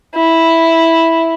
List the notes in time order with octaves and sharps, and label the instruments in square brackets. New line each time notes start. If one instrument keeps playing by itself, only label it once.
[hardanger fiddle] E4